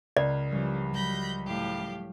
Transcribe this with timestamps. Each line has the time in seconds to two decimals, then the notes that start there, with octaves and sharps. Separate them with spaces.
0.17 C#2 A#4 D5
0.52 C#3 E3 F3 G3
0.93 F#3 G3 B5 G6 A#6
1.44 A2 G4 F5